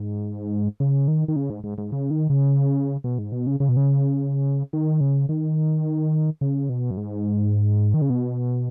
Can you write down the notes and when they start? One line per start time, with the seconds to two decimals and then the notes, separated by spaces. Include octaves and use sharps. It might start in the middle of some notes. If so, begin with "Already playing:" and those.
Already playing: G#2
0.80 C#3
1.08 D#3
1.28 D#3
1.36 C#3
1.50 G#2
1.64 G#2
1.78 G#2
1.92 C#3
2.11 D#3
2.30 C#3
3.04 B2
3.18 G#2
3.32 B2
3.47 C#3
3.60 C#3
3.69 B2
3.77 C#3
4.73 D#3
5.00 C#3
5.29 D#3
6.41 C#3
6.69 B2
6.91 F#2
6.97 G#2
7.94 D#3
8.02 C#3
8.10 B2